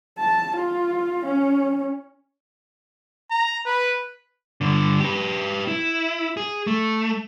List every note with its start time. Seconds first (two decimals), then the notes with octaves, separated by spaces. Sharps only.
0.19 A5
0.57 F4
1.26 C#4
3.31 A#5
3.65 B4
4.61 G2 D3
5.00 G4 B4
5.68 E4
6.37 G#4
6.67 A3